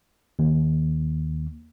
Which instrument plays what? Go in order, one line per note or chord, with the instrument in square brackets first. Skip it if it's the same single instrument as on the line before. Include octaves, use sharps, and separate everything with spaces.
[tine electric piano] D#2